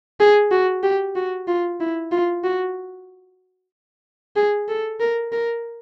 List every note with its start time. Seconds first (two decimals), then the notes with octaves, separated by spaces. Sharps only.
0.20 G#4
0.51 F#4
0.83 G4
1.16 F#4
1.48 F4
1.80 E4
2.11 F4
2.44 F#4
4.36 G#4
4.69 A4
5.00 A#4
5.32 A#4